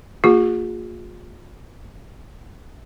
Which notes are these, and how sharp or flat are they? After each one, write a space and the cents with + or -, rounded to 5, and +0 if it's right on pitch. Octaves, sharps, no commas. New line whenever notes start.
A#3 -40 F4 +35 G#4 -30